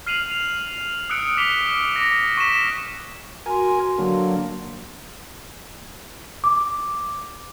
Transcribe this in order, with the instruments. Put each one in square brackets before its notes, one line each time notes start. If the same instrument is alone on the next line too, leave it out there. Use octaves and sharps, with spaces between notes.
[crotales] F6 C7 D#7 F7 F#7
F7
D#6 E6 F#6 C#7 D7
D6 B6 F7 G7
D6 A#6
C#6 B6 E7
[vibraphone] F#4 C6 [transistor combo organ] A#4 G#5
[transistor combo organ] D3 F#3 A#3
[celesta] D6